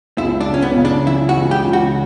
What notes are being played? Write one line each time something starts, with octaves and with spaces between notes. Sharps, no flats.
C#2 E4
D4
C#2
C#4
B3
C#3
D4
E3 E4
F#4
C#2
G4
C#2
F#4